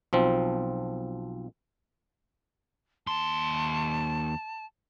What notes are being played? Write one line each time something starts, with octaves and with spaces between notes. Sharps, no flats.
B1 F3 C4
D#2 A5 C6